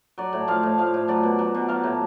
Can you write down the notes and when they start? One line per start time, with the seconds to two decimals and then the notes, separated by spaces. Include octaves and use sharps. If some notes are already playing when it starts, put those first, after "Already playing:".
0.18 F#3 D5
0.33 A2
0.48 F3 F5
0.63 A2
0.78 F3 F5
0.94 A2
1.08 F#3 D5
1.23 B2
1.39 F#3
1.55 B2
1.69 F#3 F5
1.84 A2